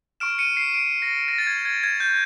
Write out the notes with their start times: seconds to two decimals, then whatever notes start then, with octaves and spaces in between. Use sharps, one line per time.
0.20 C#6 F6 D7 E7
0.39 C#7 D#7
0.57 C7 D7
0.74 C7 D7
1.02 A#6
1.28 A#6
1.38 A6
1.47 G#6
1.65 G#6
1.83 G#6
2.00 G6